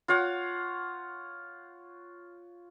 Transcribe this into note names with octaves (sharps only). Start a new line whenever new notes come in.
F4 C#5 F5 F#5